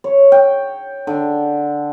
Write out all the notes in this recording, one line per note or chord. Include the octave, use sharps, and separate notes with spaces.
C#5
G5
D3